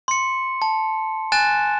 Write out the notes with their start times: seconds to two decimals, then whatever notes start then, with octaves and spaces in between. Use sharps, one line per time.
0.08 C6 C#7
0.62 A5
1.32 G#5 F#6 A6 E7